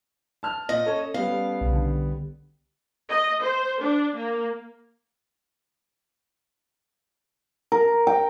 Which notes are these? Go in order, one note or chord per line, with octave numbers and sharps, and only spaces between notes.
A5 F6
A#2 D#5
C#4 A4 C#5
G3 B3 F5
B1 C#3
D3
D#5
C5
D4
A#3
A#4
G5